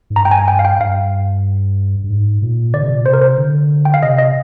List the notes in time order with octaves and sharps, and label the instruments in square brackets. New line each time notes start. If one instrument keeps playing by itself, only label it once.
[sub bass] G#2
[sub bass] G2 [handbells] A#5
[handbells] G5
G#5
G5
F5
G5
[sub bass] G2 [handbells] F5
[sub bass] G2
G#2
A#2
[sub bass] D3 [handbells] D5
[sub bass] C3
A#2
[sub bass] C3 [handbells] C5
[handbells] A#4
C5
[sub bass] D3
[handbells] G5
F5
[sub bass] C3 [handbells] D#5
[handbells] D#5